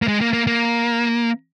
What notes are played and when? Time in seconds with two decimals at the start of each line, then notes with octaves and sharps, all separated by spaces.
0.02 A#3
0.08 G#3
0.21 A#3
0.33 A#3
0.47 A#3